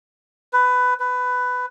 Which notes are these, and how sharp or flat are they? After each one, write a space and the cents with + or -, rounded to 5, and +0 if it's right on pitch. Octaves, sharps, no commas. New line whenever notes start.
B4 +15
B4 +15